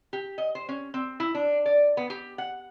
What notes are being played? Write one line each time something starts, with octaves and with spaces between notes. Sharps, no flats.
G4
D#5
C5
C#4
C4
E4
D4
D5
B3
G4
F#5